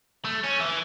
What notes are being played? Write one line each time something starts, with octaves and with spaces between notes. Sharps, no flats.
A3
C#4
E3